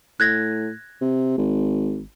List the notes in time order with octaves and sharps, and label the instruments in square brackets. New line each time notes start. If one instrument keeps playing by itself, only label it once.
[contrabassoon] A2 [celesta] F#6 G#6 A#6
[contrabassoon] C3
G#1